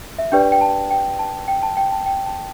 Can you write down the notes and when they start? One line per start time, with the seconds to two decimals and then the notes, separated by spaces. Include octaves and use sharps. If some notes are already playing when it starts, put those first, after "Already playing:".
0.18 E5
0.32 D4 G4 B4 D5 G5
0.52 G5
0.61 A5
0.91 G5
1.19 A5
1.48 G5
1.63 A5
1.77 G5
1.92 A5
2.06 G5
2.26 A5